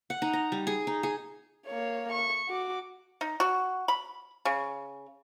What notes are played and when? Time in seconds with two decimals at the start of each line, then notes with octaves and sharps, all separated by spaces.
0.10 F#5
0.22 D#4
0.33 A#5
0.52 G3
0.67 G#4
0.87 D#4
1.03 G#4
1.66 A#3 C#5
2.12 C#6
2.48 F#4 D6
3.21 D#4
3.40 F#4
3.88 B5
4.45 C#3